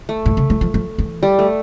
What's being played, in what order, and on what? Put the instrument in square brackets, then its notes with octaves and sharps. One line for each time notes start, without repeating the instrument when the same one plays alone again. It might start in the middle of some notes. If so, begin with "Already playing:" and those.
[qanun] A3
[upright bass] A2
C3
E3
F3
F3
E3
[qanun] G3
A3